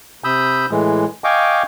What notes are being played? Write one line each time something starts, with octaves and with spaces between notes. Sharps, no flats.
C3 B5 D#6 E6 G6
A2 E3 G#3
D#5 F5 G5 G#5 C#6 D6